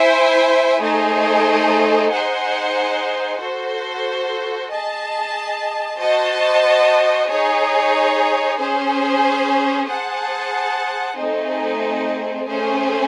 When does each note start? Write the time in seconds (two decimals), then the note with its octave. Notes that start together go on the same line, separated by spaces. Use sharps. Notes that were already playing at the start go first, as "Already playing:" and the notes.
Already playing: E4 C5 E5 G#5
0.81 A3 D#4 G#4 C5
2.11 D#4 G#4 C5 F#5
3.40 F#4 A4 C5
4.70 G#4 D#5 A5
5.99 F#4 C5 D#5 A5
7.29 D#4 G#4 C#5
8.58 C#4 G#4 C5
9.88 G#4 C5 F#5 A5
11.17 A3 C4 D#4 G#4 C5
12.47 A3 C#4 G#4 C5